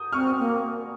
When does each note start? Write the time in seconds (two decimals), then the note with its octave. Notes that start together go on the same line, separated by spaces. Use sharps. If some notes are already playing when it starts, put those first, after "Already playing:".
Already playing: D#6 G6
0.13 C4 C#6 F6
0.39 A#3